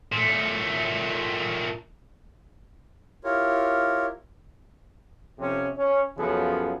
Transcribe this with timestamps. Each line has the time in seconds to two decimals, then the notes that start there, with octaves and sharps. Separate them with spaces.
0.12 A#2 A3
3.24 E4 F4 G4 A#4 C#5
5.39 F2 C3 F3 C4 C#4
5.77 C#4
6.17 F#2 C#3 F3 B3 G#4 A4